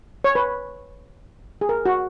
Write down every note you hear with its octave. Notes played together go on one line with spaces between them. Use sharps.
C#5
B4
G#4
A#4
F#4